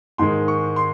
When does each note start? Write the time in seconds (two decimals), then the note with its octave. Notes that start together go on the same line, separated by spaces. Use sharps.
0.18 G#2 D#3 G#3 C6
0.48 C#6
0.76 C6